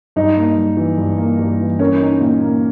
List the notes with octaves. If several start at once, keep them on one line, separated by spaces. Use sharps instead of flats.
G2 D#4
A#3
G2
E3
G2
A#3
G2
E3
C#4 A#4
D#4
A#2
A#3